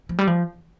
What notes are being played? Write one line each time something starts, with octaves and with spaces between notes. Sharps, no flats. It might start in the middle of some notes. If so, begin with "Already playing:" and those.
F3
G3
F3